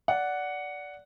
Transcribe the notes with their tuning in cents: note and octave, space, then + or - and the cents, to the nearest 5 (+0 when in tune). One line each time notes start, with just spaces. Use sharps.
D5 -15 F#5 +0